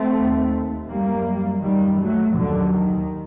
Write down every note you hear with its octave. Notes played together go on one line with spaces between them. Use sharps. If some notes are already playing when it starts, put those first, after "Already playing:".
Already playing: A3 C4
D#2
F#2 G3 A#3
F#2 D#3 G3
F#3 A3
D#2 D3 F#3
D#3